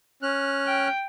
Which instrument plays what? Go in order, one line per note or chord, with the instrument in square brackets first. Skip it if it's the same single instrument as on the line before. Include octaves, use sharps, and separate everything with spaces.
[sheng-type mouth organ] C#4 F6 F#6
[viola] G5